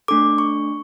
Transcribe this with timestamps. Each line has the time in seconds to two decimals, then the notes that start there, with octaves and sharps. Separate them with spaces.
0.08 A3 D4 A4 D6
0.38 C#6